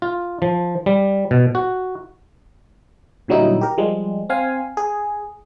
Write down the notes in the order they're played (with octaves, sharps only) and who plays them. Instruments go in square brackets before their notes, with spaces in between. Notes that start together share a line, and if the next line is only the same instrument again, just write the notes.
[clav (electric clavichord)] F4
F3
G3
B2
F#4
[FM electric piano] A#2 D3 F#3 G3 D#4 E4
G4 A#4
F3 G3 G#3
C4 F5 G#5
G#4